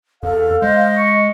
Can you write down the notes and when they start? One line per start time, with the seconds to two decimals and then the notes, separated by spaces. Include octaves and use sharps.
0.23 E2 A4 F5
0.62 G#3 C5 D#5
0.97 C#6